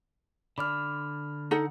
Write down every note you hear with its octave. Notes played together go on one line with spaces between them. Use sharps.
D3 D5 B5 F6
D#4 A4 F#5